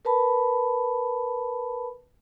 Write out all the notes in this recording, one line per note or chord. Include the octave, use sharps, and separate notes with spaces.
A#4 B4 A5 B5